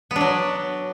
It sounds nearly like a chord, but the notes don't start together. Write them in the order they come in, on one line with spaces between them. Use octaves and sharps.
B3 D4 F#3